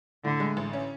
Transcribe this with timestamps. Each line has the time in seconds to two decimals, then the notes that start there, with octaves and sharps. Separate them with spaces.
0.24 A2 D3
0.40 G#3
0.57 A1
0.73 C#4